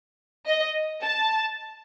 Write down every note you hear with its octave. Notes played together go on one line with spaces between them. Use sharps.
D#5
A5